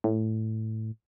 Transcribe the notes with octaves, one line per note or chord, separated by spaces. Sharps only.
A2